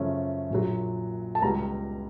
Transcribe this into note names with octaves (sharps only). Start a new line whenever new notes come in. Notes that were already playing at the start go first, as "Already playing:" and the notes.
Already playing: F#2 C#3 F3 A3 C#4
A#1 A#2 F#3
A5
C#2 B2 G3 A#5